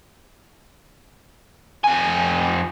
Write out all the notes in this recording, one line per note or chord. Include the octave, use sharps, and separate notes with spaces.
F2 G#5